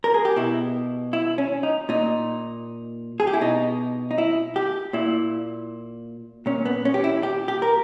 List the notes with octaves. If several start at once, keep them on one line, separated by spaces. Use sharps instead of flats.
A#4
G#4
G4
B2 E4
E4
C#4
D#4
A#2 D#4
G#4
G4
E4
B2 D#4
D#4
E4
G4
A#2 E4
A#2 C#4
B3
C#4
G4
E4
G4
G4
A#4